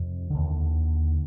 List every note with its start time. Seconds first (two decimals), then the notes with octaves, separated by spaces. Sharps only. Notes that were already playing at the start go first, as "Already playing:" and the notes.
Already playing: F2 C3
0.30 D#2 D3